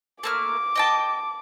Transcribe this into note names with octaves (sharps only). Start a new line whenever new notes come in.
A3 A#3 D6 F6
D#5 G5 A5